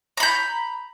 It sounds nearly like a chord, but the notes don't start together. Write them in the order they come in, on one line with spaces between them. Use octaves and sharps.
A#5 B5 G6